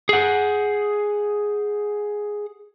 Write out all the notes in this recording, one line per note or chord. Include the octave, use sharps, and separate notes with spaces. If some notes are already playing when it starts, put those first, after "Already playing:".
G#4 F#5